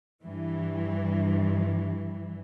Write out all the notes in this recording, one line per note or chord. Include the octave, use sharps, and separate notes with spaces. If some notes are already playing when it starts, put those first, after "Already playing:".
G2 E3